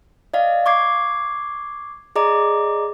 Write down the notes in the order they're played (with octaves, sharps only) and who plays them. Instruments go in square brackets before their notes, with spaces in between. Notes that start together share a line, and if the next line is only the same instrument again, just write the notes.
[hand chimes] D5 D#5 F5
C#6 D6 G#6 C7
G#4 D5 D#5 A#5 D6